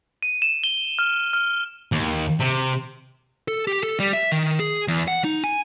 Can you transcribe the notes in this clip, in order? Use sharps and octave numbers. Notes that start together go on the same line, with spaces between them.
D#7
E7
G7
F6
F6
D#2
C3
A4
G4
A4
G3
E5
D#3
G#4
E2
F#5
D#4
G#5